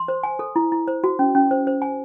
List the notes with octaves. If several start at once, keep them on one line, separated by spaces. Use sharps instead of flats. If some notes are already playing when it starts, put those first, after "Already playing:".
Already playing: C6
C5
G#5
A4
E4
E4
C5
F#4
C#4
C#4
C5
C5
G#5